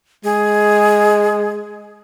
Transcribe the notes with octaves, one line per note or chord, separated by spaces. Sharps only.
G#3 G#4